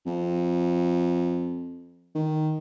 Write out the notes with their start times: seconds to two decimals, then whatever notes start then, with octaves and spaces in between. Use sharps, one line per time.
0.06 F2
2.15 D#3